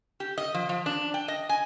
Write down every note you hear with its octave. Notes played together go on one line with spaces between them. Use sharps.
G4
D#5
F3
F3
D4
G5
D#5
G#5